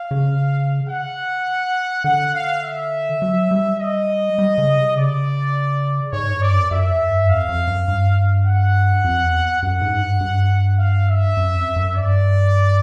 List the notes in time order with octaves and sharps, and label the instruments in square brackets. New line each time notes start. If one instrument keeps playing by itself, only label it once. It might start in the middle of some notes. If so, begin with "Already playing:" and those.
Already playing: [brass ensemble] F5
[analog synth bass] C#3
[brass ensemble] F#5
[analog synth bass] D3 [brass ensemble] F#5
[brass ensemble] F5
E5
[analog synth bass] F#3
G3
[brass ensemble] D#5
[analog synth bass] G3
C#3
C3
[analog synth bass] C#3 [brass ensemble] D5
[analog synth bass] G#2 [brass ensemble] C#5
[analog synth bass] G2
[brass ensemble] D5
[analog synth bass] F#2
[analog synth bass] F#2 [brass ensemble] E5
[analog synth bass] F2
G2
[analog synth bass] F2 [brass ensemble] F5
[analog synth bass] F2
F#2
G2
[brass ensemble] F#5
[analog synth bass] F2
E2
[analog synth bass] F#2 [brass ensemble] F#5
[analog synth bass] G#2
G2
G2
[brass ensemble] F5
E5
[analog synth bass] F#2
F2
F#2
[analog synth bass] G2 [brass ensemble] D5